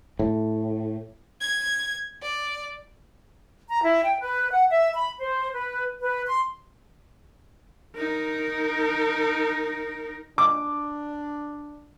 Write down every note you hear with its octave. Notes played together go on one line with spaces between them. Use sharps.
A2
G#6
D5
A#5
E4
G5
B4
F#5
E5
B5
C5
B4
B4
C6
D#4 A#4
D4 D6